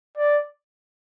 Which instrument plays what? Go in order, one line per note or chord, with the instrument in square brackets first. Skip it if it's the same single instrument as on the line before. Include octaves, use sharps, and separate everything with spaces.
[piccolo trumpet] D5